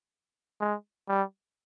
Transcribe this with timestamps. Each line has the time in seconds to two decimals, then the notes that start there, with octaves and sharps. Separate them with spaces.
0.60 G#3
1.08 G3